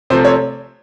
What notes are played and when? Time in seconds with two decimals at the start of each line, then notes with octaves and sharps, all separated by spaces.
0.10 C3 F3 A3 C4 C5
0.25 C#5